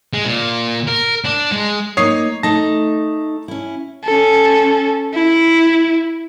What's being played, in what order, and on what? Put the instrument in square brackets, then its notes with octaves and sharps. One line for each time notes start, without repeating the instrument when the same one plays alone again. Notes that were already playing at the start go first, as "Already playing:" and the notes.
[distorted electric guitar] G#3
A#2
A#4
D4
G#3
[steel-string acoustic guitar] A#3 D#4 D#5 [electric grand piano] C#5 D#6 C7
[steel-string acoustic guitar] A3 D#4 [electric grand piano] A5 A#6
[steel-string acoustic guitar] C#4 E4
[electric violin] C#4 A4
E4